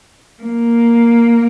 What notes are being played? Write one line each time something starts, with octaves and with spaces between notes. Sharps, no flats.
A#3